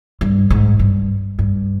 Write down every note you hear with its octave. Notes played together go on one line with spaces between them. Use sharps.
G2
G#2
G2
G2